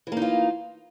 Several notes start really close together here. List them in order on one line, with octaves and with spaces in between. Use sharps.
E3 A#3 D#4 F4